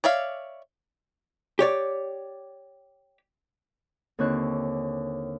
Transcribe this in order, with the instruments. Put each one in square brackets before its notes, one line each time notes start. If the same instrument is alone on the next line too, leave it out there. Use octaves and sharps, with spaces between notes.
[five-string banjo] C#5 D5 E5 F5
[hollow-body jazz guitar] G4 C#5 D5
[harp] D#2 D3 C4 C#5 F#6